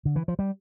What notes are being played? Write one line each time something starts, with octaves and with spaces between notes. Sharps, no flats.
D3
E3
F3
G3